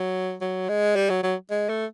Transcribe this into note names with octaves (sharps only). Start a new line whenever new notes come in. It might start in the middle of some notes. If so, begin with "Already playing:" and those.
Already playing: F#3
F#3
G#3
G3
F#3
F#3
G#3
A3